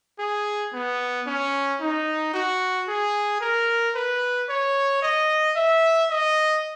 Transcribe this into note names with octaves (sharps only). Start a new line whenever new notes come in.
G#4
B3
C#4
D#4
F#4
G#4
A#4
B4
C#5
D#5
E5
D#5